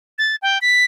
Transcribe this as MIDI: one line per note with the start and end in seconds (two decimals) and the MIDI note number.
0.18 0.36 93
0.42 0.58 79
0.61 0.85 95